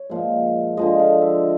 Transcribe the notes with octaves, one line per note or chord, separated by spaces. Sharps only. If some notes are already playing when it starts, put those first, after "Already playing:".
Already playing: C#5
A#2 F3 G#3
D3 F3 G#3 D#5
F5
E5